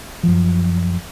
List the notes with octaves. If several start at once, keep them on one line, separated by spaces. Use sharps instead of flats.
F#2 F3